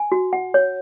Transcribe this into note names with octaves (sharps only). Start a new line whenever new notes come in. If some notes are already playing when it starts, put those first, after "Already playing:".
Already playing: G#5
F#4
F#5
C#5